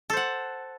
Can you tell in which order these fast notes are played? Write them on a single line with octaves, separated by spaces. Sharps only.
A4 C5 F#5